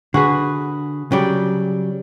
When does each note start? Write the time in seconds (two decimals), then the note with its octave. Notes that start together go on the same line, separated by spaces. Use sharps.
0.14 D3 F#4 G#4 B4
1.12 C#3 F#3 G3 D5 G5